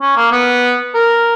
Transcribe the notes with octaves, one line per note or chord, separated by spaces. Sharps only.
C#4
A#3
B3
A#4